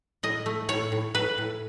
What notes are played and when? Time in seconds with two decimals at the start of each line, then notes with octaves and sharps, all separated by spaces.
0.23 A2 D#5
0.46 A3
0.69 A2 C#5
0.92 A2
1.14 A2 B4
1.38 A2